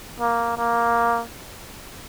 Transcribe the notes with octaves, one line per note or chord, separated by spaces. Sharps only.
A#3
A#3